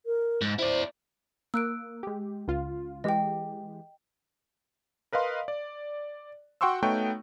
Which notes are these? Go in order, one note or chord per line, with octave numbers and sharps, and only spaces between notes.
A#4
G#2
E4 C5 D5
A#3 E6 F#6 D7
G#3 G4
C#2 F4
E3 G#3 G4 D#5 G5
A#4 B4 D#5 F5 C6
D5
F#4 F#5 G5 C6 C#6 E6
A3 B3 D#4 F#4 C#5 G5